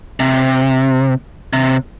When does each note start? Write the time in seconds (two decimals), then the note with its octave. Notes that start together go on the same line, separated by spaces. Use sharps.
0.20 C3
1.53 C3